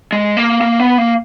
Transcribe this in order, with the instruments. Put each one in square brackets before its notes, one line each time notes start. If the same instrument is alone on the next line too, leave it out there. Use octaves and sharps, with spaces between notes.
[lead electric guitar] G#3
A#3
A#3
B3
A#3